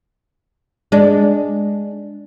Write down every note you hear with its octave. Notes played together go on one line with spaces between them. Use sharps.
G#3 D4